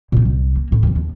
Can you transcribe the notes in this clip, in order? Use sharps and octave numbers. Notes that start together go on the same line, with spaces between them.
A#2 G3
C2
A#3
C2 A2
D#2 F3
D#2